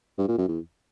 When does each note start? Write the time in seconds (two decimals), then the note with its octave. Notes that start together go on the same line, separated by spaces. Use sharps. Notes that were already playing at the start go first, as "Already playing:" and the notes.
0.18 G2
0.28 A#2
0.38 F#2
0.48 E2